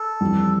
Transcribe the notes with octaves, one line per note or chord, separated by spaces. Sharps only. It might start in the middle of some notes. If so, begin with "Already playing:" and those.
Already playing: A4
F2 E3 G3 C4